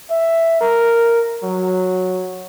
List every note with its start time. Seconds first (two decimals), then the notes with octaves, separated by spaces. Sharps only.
0.11 E5
0.61 A#4
1.43 F#3